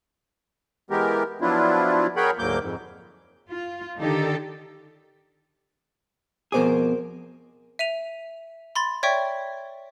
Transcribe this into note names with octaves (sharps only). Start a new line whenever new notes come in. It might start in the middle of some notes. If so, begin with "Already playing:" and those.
E3 G#3 B3 G4 A#4
F3 F#3 B3 D4 E4 F4
G#4 A#4 C#5 F#5 G5 B5
D2 G#2 F#3 A#3 D6 G6
F2 G#2
F4
D3 D#3 D#4 G4 A4
F2 B2 G#4 A#4 C5 D6
E5 D#7 F7
B5 C6 A6
C#5 D5 E5 G5 C#6